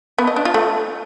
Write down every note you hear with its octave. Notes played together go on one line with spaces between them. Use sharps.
B3
D#5
D4
F4
A3